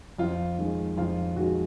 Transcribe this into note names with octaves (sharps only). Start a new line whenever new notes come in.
F2 F4
D#3 G#3
F2 F4
D#3 G#3 F#4